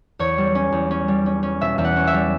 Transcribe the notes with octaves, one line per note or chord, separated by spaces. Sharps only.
E2 C#5
G3
C#4
E2
C#4
G3
C#4
C#4
B2 E5
E2 E5
F#5
C#4
E5
G3